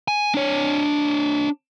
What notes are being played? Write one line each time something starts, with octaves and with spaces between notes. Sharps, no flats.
G#5
D4 C#5